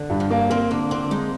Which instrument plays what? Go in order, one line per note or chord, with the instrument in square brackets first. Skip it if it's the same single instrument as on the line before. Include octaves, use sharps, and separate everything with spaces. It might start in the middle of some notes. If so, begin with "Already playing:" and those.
Already playing: [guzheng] D3
[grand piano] G2
[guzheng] F3
[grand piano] A#3
[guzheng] C4 [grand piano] A#4
[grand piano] D3 [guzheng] A#3
[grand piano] D3 [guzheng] C4
[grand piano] G#3 [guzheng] D#4